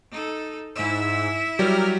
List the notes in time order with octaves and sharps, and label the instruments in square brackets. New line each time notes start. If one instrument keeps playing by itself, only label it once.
[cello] D#4 A4
[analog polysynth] G#2 E6 [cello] E4 E5
[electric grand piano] F#3 G3 [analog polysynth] G4 A#4 F6